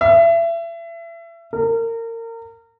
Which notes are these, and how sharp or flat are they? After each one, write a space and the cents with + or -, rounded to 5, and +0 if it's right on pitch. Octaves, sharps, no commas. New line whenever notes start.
E5 +30
A#4 -30